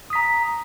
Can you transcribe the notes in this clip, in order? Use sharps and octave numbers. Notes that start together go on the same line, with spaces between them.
A#5 D#6 B6